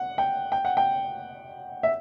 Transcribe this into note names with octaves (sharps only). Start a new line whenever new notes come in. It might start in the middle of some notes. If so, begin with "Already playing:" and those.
Already playing: F#5
G5
G5
F#5
G5
E5